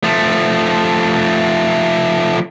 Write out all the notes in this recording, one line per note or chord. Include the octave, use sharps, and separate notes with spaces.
F3 A3